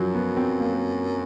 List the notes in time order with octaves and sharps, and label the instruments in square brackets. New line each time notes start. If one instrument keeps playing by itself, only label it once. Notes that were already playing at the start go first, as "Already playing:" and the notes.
Already playing: [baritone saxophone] F#2 [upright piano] F3 F#3
[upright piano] B3
C4
A#3